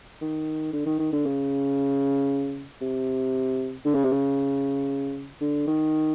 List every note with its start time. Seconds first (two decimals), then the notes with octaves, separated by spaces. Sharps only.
0.21 D#3
0.73 D3
0.86 D#3
0.99 D#3
1.12 D3
1.26 C#3
2.81 C3
3.85 D3
3.94 C#3
4.04 C3
4.12 C#3
5.41 D3
5.67 D#3